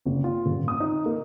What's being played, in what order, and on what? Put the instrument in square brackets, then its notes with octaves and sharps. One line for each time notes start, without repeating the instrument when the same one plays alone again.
[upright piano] F#1
F4
D#1
D#6
D#4
A#3